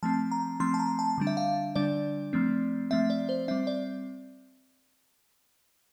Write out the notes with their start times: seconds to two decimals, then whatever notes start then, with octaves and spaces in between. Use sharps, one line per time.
0.03 F3 A3 C4 A5
0.31 A#5
0.60 F3 A3 C4 C6
0.74 A5
0.79 A#5
0.99 A5
1.18 D3 G3 D4
1.27 E5
1.37 F5
1.75 D3 G3 D4 D5
2.33 F3 A3 C4
2.91 F3 A3 C4 E5
3.10 D5
3.29 C5
3.48 G3 C4 E5
3.67 D5